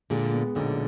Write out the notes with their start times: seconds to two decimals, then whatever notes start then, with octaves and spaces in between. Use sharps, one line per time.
0.10 A#2 D3 G#3
0.33 B3
0.55 B1 A#2 D3